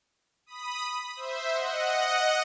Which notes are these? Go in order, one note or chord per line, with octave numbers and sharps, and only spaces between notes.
B5 D#6
C5 E5
D#5 F#5